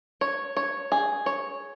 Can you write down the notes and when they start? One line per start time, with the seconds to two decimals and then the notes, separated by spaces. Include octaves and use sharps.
0.21 C#5
0.57 C#5
0.92 G#4
1.26 C#5